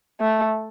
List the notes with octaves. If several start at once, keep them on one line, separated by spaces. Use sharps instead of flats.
A3